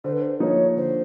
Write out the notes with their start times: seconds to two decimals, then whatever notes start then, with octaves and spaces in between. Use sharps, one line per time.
0.04 D3 C5
0.12 B4
0.21 C5
0.40 F3 A#3 D#4 C#5
0.77 D3 C5